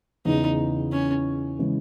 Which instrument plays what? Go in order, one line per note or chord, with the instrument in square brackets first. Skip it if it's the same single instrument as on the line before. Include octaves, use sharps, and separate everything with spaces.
[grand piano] E2 C#3 E3 [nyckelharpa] D#4
[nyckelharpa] C#4
[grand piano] C#3 E3 G#3